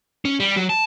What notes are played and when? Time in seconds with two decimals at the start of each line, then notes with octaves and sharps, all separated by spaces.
0.25 C#4
0.40 G3
0.56 F#3
0.69 A5